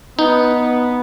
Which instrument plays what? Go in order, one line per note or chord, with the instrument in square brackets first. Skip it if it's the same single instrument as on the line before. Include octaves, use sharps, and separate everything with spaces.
[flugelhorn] B3 [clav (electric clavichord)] D#4